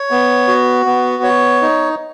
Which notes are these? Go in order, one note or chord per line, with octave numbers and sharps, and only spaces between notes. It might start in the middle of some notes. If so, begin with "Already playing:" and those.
Already playing: C#5
B3
F#4
B3
C#5
D#4